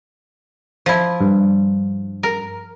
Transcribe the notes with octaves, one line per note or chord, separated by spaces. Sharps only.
F3 E4
G2
A#4